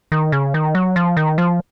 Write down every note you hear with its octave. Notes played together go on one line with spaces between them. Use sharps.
D#3
C#3
D#3
F#3
F3
D#3
F3